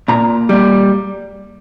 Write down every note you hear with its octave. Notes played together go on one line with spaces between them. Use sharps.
A#2 A#5
G3 A#3